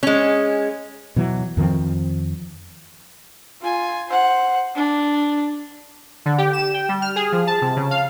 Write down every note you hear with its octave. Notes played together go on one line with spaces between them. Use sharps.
G#3 C#4
B2 E3 F#3
F2 D#3 F3 C4
F4 G#5
C5 F#5
D4
D3
G4
E7
G5
G3
F6
G#4
F3
A5
C3
C#3
F5